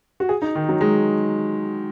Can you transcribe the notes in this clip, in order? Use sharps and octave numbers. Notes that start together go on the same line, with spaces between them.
F#4
G#4
D#4
D#3
F#3
G#3